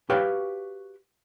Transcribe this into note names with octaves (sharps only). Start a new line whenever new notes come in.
F#4 G4 B4 C#5 F5 G5